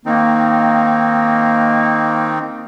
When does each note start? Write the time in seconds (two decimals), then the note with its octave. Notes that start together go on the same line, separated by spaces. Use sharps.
0.06 D#3 A#3 C4 D#4